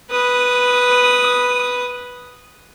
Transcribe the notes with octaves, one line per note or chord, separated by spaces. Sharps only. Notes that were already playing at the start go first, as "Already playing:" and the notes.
B4 D#6